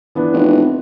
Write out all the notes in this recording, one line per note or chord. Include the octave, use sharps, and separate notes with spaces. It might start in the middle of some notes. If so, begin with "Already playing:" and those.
E3 B3 D4
F1